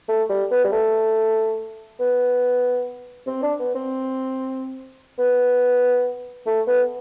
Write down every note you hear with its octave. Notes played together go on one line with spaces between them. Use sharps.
A3
G3
B3
G3
A3
B3
C4
D4
B3
C4
B3
A3
B3